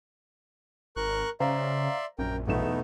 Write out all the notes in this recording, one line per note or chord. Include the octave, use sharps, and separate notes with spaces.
G#1 A#4 C#6 F#6
C#3 C5 D5 E5 F5 A#5 C6
A#1 F#2 A#4 G5
B1 E2 A3 B3 D#4 E7